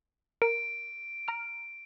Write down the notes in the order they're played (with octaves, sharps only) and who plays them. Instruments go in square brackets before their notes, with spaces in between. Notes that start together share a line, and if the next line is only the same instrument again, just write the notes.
[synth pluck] A#4 [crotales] D7
[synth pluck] A#5 F6